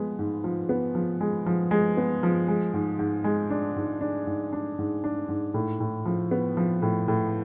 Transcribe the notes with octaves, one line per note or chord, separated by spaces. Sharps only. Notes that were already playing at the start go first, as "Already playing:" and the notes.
Already playing: F3 G#3 B3
G#2
F3
B3
F3
G#3
F3
G#3
B3
F3
G#3
G#2
G#2
G#3
D4
G#2
D4
G#2
D4
G#2
D4
G#2
A2
A2
F3
B3
F3
A2
A2